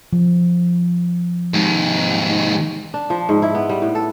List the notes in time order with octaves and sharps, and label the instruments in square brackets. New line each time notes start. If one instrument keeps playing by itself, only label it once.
[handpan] F3
[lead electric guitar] D#2 G#2 [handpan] G#3
[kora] D4
F3
G#2
E4
B3
G3
A2
A4